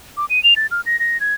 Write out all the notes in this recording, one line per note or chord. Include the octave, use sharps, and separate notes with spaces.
D6
D#7
F7
A6
F6
A#6
A#6
G#6